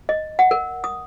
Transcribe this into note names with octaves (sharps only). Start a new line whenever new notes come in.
D#5
F#5
A#4
D#6